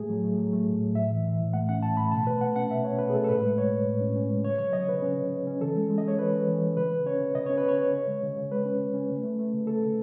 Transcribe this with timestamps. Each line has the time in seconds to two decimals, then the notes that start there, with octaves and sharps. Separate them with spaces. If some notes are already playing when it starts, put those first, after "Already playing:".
Already playing: A2 A3 G#4
0.09 F#3
0.24 A3
0.38 F#3
0.53 A3
0.67 A2
0.81 A2
0.95 A2 E5
1.11 E3
1.25 E3
1.40 A2
1.53 A3 F#5
1.69 C#4 F#5
1.83 A2 A5
1.97 A3 B5
2.12 B2 A5
2.26 B2 B4
2.41 A3 F#5
2.56 C#4 F#5
2.71 B2 E5
2.84 C#4 C#5
2.99 B2 B4
3.09 G#4
3.14 A3 A4
3.24 A4
3.29 A2 B4
3.43 G#3
3.57 G#3 C#5
3.72 A2
3.87 A2
4.01 C#4
4.16 C#4
4.30 G#3
4.44 C#3 C#5
4.58 F#3 C#5
4.73 C#3 D#5
4.87 C#3 B4
5.02 C#4
5.18 C#3
5.31 C#3
5.47 C#4
5.61 E3 A4
5.75 G#3
5.90 G#3
5.98 D#5
6.04 G#3 C#5
6.18 E3 B4
6.33 E3
6.48 E3
6.62 G#3
6.77 C#3 B4
6.91 C#3
7.06 C#4 C#5
7.20 C#3
7.35 C#3 D#5
7.46 C#4 C#5
7.58 B4
7.64 C#4 C#5
7.78 C#3
7.93 C#3
8.07 G#3
8.23 C#3
8.36 C#3
8.51 G#3 B4
8.65 C#4
8.80 C#3
8.94 C#4
9.10 A3
9.23 A3
9.39 A3
9.53 C#3
9.67 A3 A4
9.81 C#3